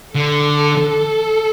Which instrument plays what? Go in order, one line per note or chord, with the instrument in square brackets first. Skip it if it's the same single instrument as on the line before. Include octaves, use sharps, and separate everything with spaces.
[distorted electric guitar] D3 [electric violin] A4